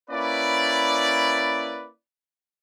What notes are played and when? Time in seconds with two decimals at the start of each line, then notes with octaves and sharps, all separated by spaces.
0.10 A#3 C#4 E4 B4 D5